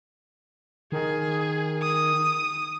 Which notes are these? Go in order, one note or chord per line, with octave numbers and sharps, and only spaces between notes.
D#3 G#4
D#6